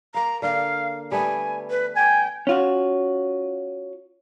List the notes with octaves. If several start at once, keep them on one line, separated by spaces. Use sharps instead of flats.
A#3 F5 A#5
D3 A#3 F5
G3 A3 B3 G#5
B4
G5 G#5
C#4 F4 F#4